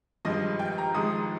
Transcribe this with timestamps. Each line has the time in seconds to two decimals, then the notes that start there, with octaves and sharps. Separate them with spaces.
0.25 G#1 G2 F3 G#3 D#5
0.59 G5
0.78 A#5
0.94 G#1 G#2 F3 G#3 D#6